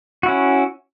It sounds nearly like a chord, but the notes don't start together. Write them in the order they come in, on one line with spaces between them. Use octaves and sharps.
F#4 E4 C#4